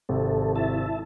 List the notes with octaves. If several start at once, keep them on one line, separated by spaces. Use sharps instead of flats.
G#1 C3 A4
E4 E5 A5